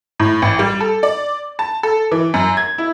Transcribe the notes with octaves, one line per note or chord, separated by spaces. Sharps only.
A2
A1
G3
A4
D5
A5
A4
E3
F#2
G#6
E4